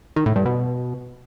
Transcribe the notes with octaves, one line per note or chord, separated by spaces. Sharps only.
D#3
A2
G2
B2